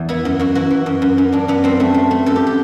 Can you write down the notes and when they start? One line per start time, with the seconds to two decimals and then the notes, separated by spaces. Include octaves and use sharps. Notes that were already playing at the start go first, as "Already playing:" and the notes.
Already playing: E2
0.09 B3 E4
0.25 F#2
0.39 F#2 F#4
0.55 E3 F#4
0.70 E3
0.86 F#2
1.02 F#2
1.18 F#2
1.32 F#2 D4
1.48 F#2 B3
1.64 F#2 C4
1.80 A3
1.94 A3
2.11 A3
2.26 F#2 A4
2.36 G4
2.47 G4